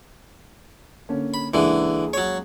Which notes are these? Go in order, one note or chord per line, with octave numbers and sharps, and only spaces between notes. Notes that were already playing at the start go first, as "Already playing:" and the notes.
D3 A#3 C#4
B5
C#2 D3 E3 A#3 G#4
F#3 C#5